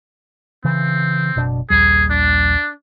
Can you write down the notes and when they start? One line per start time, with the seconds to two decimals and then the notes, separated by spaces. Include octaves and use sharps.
0.65 C#3 E3 C4
1.36 F#1 B2 D4
1.70 A#1 D#2 G3 G#4
2.10 D4